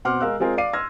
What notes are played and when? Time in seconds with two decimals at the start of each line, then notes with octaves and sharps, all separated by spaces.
0.05 B2 C4 F#5 C6 D6 F6
0.20 G#3 A#4 F5 E6 F#6
0.40 G#3 C4 F4 G#4 A#4
0.57 D5 F5 D6 C7 D#7
0.73 C6 E6 F6 G#6 A#6